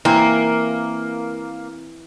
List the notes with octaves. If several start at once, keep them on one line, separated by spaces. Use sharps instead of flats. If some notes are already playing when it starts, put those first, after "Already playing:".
E3 A#3 C4